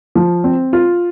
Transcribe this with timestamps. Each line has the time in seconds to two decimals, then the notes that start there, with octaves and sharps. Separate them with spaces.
0.15 F3
0.44 C4
0.73 F4